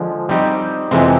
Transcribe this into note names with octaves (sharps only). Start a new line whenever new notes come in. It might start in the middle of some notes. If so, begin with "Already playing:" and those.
Already playing: D3 F3 G#3
G3 C4 D#4 G4
F2 C3 E3 G#3 C4